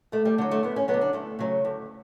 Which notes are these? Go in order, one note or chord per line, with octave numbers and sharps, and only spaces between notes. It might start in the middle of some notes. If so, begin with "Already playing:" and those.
D2 A3
G3
D3 F#3
A3
D2 B3
C#4
F#3 B3
D3
D4
D2 A3
C#3 F#3
D2